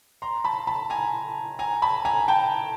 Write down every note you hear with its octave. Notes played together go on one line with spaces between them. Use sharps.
A#5 C6
A5 B5
A5 B5
G#5 A#5
G#5 A#5
A5 B5
G#5 A#5
G5 A5